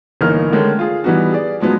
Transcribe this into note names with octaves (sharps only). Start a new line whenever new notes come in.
G1 E3 A#3 D#4 F6
D3 D#3 G#3 A3 C#4
F4 G#4
E3 G3 B3 D#4 F#4
G#4 D5
F3 F#3 G#3 B3 D#4